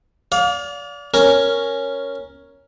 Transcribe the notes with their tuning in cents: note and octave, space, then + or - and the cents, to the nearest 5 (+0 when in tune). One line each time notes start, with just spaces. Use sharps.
D5 -30 F5 +30
C#4 +0 A#4 +0